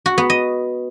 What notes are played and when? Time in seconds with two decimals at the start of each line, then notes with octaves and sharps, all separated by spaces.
0.06 F#4
0.18 B3
0.30 D#5